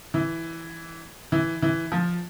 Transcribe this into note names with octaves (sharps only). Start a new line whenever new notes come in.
E3
E3
E3
F3